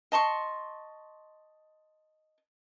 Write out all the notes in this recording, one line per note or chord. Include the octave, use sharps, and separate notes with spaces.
D#5 A5 C6 C#6